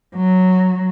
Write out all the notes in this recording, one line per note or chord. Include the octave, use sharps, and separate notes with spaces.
F#3